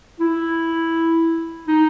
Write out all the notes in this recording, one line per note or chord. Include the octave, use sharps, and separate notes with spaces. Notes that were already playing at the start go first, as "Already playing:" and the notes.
E4
D#4